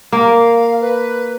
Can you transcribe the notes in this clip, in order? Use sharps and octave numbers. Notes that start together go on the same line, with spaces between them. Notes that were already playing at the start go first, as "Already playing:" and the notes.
A#3 F5
B4